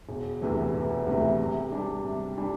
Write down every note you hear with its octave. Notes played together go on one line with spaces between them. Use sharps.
E1
D2 C3 E3 A3
E1
D2 C3 E3 A3
C3
G3 D4
C3
G3 D4